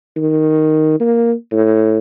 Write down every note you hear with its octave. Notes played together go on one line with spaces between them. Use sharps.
D#3
A#3
A2